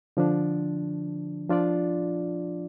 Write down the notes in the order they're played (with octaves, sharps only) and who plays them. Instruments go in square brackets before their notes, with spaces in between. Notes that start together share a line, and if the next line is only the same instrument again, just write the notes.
[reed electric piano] D3 F3 D4
F3 D4 F4 D5